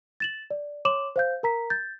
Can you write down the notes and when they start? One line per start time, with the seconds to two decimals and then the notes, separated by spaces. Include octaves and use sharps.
0.20 A6 E7 F#7
0.51 D5
0.85 C#5 C6 D6 E7 F#7
1.16 C5 F5 G6
1.43 A#4 A#5 B6
1.70 G6 A6